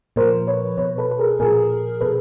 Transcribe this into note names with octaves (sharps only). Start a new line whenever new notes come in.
A#2 F3 A#4 C5
B4 C#5
B2 B4 C#5
A4 B4
B4
G#4 A#4
A#2 F3 G#4 A#4
B2 A4 B4